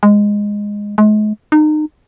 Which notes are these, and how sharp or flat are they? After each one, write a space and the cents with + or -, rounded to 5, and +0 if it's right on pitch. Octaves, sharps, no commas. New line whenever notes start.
G#3 -10
G#3 +40
D#4 -30